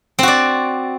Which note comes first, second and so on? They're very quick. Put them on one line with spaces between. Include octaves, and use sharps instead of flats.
C4 F#4 D5